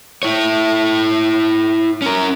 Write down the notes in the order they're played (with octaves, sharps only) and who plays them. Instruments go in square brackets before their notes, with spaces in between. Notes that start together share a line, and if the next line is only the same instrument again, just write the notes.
[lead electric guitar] E4 C#5
C#4 A#4